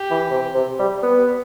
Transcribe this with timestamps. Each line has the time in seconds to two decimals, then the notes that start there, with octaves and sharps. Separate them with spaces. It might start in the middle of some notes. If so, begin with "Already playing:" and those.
Already playing: G4
0.11 E3
0.30 C3
0.54 C3
0.79 G3
1.03 B3